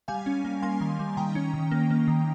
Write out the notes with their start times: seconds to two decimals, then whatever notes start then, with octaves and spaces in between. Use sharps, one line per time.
0.08 G3 F5 G#5
0.26 C#4
0.44 A#3
0.62 A#3 G#5 C6
0.81 D#3
0.99 G3
1.17 D#3 G5 A#5
1.35 C#4
1.54 D#3
1.71 A#3
1.90 A#3
2.08 D#3